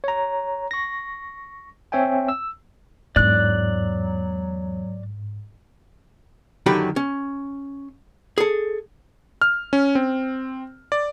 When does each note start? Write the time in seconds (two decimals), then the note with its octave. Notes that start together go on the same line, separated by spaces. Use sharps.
0.04 C#5 A#5
0.71 C#6 A#6
1.92 C4 C#5 E5 G5 G#5
2.28 E6
3.16 E2 G#2 F#3 D4 D5 F#6
6.66 F#2 D3 D#3 F#3 G4 B5
6.96 C#4
8.38 G#4 A4
9.42 F6
9.73 C#4
9.95 C4
10.92 D5